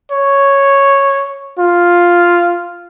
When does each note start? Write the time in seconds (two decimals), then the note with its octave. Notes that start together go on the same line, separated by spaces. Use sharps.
0.11 C#5
1.59 F4